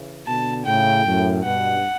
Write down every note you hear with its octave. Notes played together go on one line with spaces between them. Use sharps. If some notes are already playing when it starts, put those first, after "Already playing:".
Already playing: C#3 E3
B2 D3 A5
A2 C#3 G5
F#2 A2
G2 B2 F#5